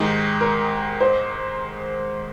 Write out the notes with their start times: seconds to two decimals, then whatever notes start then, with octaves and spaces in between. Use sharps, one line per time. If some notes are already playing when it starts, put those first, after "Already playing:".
Already playing: G#2 D#3 G#3 D#4 G4
0.41 A#4
1.01 C5